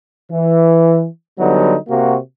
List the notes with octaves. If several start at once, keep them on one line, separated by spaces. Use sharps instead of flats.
E3
D3 F#3 G3 B3 D#4
C3 A#3 F#4